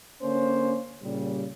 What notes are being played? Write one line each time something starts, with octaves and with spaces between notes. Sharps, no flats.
D3 A#3 C#4 C5
A#2 C#3 G3